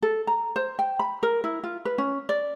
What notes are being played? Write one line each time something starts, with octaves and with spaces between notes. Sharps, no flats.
A4
A#5
C5
G5
B5
A#4
E4
F4
B4
C#4
D5